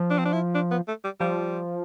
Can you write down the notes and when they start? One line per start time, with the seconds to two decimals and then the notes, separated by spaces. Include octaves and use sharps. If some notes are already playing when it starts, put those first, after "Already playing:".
Already playing: F3
0.10 D4
0.18 C4
0.25 D4
0.33 E4
0.55 D4
0.71 B3
0.88 A3
1.04 G3
1.20 F3 G3